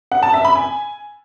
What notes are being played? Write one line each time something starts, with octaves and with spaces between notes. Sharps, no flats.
F#5
A5
E5
B5
G#5